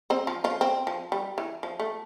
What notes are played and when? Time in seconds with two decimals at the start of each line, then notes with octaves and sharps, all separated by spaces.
0.10 C4 C5
0.27 F3 F4
0.44 F3 F4
0.61 C4
0.87 F3
1.12 G3
1.38 E3
1.63 F3
1.80 A3